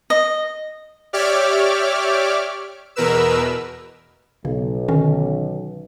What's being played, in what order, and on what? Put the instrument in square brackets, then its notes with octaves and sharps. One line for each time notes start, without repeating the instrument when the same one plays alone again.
[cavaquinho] D#5
[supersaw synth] G4 C#5 D5 E5 D6 F6
E2 B2 A#4 B4 E6
[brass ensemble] B1 [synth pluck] C#3
[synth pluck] D3 D#3 C#4